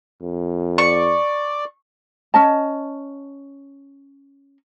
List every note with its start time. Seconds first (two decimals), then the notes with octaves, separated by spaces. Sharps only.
0.22 F2
0.78 D5 C#6
2.34 C#4 D#5 A5